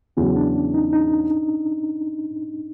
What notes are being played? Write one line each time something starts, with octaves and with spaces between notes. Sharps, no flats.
E2 C#3 F#3 C#4
D4
D#4
D#4